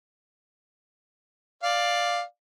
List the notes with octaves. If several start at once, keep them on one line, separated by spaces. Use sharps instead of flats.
D5 F5